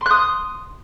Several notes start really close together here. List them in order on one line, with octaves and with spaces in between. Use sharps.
C6 F#6 D#6